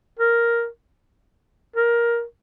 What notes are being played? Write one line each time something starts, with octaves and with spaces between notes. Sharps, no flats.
A#4
A#4